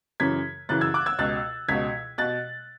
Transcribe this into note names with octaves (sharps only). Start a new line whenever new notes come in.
F#2 C#3 E3 G#6 B6
F#2 C#3 E3 F#6 A6
E6 G#6
D6 F#6
E6 G#6
C#2 B2 F#6 A6
C#2 B2 G#6 B6
B2 F#6 A6